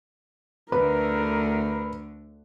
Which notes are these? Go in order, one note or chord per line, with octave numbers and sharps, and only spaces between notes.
D2 D3 A#4 B4